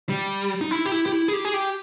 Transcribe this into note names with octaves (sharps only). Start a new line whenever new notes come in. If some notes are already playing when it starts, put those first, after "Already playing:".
G3
D#4
E4
G4
E4
G4
E4
G#4
G4
G#4
G4